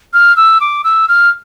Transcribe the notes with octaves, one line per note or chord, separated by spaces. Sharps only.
F6
E6
D6
E6
F6